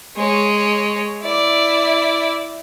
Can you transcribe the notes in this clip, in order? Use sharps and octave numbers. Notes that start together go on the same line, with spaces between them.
G#3 C#5
E4 D5